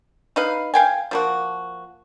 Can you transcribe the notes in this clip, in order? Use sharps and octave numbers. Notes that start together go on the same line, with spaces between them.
D#4 B4 F5
F5 G5 G#5
F3 A#3 F#4